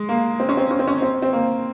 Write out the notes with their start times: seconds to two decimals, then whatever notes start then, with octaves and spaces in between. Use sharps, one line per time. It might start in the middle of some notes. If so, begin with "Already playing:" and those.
Already playing: G#3
0.09 A#3
0.40 C4
0.49 C#4
0.57 C4
0.71 C#4
0.79 C4
0.87 C#4
1.02 C4
1.22 C4
1.33 A#3